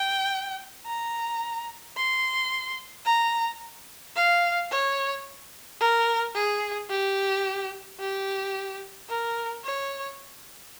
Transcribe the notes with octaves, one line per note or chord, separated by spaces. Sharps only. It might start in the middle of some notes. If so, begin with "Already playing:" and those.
Already playing: G5
A#5
C6
A#5
F5
C#5
A#4
G#4
G4
G4
A#4
C#5